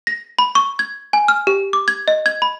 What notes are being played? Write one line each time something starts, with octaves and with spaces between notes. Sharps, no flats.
A#6
B5
C#6
G#6
G#5
F6
G4
D6
G#6
D#5
G#6
B5